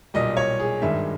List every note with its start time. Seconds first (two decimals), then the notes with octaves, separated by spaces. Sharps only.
0.14 B1 A#2 G3 D#5
0.37 C#5
0.60 G#4
0.82 G#1 G2 D#3 G#3 E5